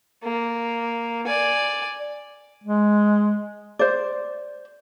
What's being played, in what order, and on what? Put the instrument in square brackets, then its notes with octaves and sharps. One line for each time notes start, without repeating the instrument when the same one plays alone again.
[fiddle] A#3
D5 G#5
[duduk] G#3
[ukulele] C5 D5